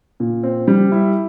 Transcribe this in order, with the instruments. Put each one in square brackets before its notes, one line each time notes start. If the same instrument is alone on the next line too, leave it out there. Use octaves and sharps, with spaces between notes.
[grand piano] A#2
C4
G3
E4